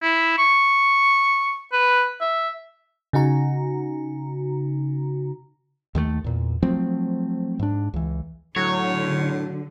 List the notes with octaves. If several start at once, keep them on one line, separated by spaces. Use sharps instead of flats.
E4
C#6
B4
E5
C#3 D#4 F#4 A#5
D#2 D#3 G3 A3
E2 A#2
F3 F#3 A3 C4
G#2 D4
C#2 E3
A2 D3 F#3 C#5